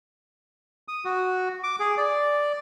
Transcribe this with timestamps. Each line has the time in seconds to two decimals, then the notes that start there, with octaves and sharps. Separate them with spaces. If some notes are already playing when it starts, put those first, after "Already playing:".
0.88 D#6
1.05 F#4
1.63 D6
1.80 G#4
1.98 D5